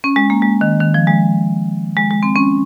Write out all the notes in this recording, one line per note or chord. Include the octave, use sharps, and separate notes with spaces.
C#4
G#3
A#3
G#3
D#3
D#3
F3
G#3
G#3
G#3
C4
C#4